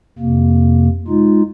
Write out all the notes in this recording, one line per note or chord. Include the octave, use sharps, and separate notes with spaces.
F2 C3 A#3
G#3 D#4 F4